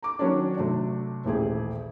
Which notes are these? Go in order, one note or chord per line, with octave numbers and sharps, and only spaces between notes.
A#5 D6
D#3 F#3 C#4 D4
C3 F#3 A3 D4
D#1 A1 G4 G#4